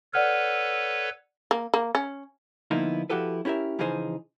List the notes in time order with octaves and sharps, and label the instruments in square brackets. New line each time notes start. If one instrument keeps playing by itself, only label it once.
[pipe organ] A4 B4 C#5 [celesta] D5 F#5 F6
[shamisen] A#3
A#3
C#4
[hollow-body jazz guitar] D3 F3 A#3 B3 D#4 E4
F3 E4 F#4 G4 A4 B4
C#4 E4 G4 A#4 E5
C#3 E3 F3 D#4 G#4 C5